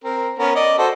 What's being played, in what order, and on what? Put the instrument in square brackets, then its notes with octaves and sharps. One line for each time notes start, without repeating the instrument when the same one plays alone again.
[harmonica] C4 A#4
B3 C#4 A#4
D5 D#5
F#4 A4 C5